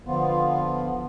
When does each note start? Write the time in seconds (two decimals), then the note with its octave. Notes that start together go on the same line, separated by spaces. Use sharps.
0.06 D3 F3 B3 F4